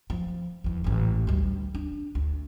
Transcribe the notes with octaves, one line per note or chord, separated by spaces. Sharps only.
F3
E2 F3
A1 G#2
D2 G3
D4
D2